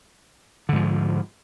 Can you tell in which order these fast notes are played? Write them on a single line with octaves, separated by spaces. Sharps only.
D3 G#2 F3